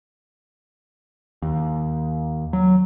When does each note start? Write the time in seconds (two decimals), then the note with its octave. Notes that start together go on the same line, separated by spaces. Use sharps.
1.42 D#2
2.53 F#3